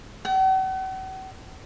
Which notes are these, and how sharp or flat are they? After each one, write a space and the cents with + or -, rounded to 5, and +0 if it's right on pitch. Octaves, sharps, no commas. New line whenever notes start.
F#5 +45